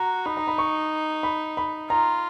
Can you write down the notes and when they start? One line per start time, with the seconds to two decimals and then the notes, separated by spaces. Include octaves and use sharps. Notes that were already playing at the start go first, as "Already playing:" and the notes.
Already playing: F#4 A#5
0.26 D#4 B5
0.37 A#5
0.47 B5
0.58 C#6
1.23 B5
1.57 B5
1.89 F4 A#5